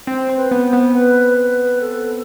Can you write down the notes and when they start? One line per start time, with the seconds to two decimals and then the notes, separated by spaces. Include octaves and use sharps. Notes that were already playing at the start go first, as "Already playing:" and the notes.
0.07 C4 C5
0.30 C4
0.37 B4
0.51 B3
0.66 C5
0.73 B3
0.94 B4
1.38 B4
1.81 A4